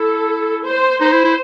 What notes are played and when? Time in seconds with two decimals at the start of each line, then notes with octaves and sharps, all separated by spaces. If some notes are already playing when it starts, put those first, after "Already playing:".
Already playing: E4 A4
0.65 C5
1.01 D#4 C5
1.13 E4
1.24 E4